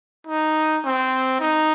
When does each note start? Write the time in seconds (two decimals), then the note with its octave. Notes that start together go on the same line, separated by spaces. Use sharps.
0.27 D#4
0.84 C4
1.40 D#4